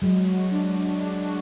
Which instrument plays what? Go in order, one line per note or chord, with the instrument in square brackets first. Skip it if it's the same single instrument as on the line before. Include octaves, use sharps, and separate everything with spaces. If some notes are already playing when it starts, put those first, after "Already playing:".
[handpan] F#3 [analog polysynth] G#3
[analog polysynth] F#4
D4
D4
D4
F#4